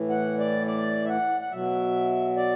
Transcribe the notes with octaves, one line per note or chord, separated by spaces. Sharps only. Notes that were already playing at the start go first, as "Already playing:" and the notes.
Already playing: A2 E3
F#5
D5
D5
E5
F#5
F#5
B2 F#3 E5
D5